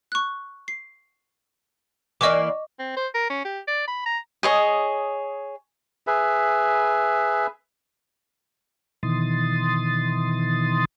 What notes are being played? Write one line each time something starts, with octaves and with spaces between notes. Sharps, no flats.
C#6 F#6
C7
E3 A#3 D5 D#5 C#6 D6
C4
C5
A#4
C#4
G4
D5
B5
A#5
G#4 C#5 D#5
G#4 B4 E5
B2 D#3 E3 C6 D#6 A6